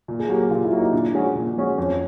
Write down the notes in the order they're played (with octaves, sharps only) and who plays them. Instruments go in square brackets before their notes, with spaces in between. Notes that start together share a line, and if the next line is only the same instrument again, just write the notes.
[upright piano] A#2
[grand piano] G#4
[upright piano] F#3 A#3 [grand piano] G4
[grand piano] G4
[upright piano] A#2 [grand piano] F4
[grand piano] E4
[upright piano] F#3 A#3
[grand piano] D#4
[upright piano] A#2 [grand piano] D4
[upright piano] F3 G#3 C#4 F#4
A#2
F3 G#3 C#4 F#4
[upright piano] F2 [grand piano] C#4